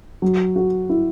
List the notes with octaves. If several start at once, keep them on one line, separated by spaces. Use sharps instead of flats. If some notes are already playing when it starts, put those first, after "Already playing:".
F#3
F#4
E4